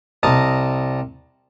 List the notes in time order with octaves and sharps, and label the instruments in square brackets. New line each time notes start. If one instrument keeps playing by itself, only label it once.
[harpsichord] C2 D#5 A5 A#5